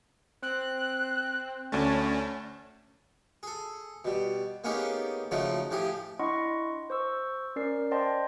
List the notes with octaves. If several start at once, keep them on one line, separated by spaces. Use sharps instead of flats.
C4 F#6
D2 A3 C#4 D5 A5
G#4 A4
B2 G3
A#3 B3 C#4 D#4 G4 G#4
C#3 F3 F#3 G#3 A3 D#4
A2 F3 G4 G#4
D4 E4 D#5 F#5 C6 C#6
C5 C#6 E6
C#4 A#4 D5 C7
C5 D5 D#5 G5 A5 C6